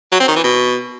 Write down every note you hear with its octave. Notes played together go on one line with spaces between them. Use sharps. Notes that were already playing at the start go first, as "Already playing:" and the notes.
F#3
C4
D#3
E3
B2